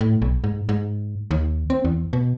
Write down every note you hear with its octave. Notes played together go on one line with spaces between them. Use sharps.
A2
B1
G#2
G#2
D#2
C4
E2
B2